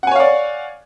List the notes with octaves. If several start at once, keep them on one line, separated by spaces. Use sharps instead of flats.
C#5 D5 F5 F#5 G#5